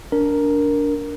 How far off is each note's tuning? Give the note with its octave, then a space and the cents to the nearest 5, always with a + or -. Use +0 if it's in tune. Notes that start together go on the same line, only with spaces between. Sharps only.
D4 -20 A#4 +0